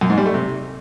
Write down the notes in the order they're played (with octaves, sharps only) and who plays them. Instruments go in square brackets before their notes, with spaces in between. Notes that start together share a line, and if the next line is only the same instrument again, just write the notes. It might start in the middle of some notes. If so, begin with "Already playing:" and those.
[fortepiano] F#2
G#2
G3
A3
C3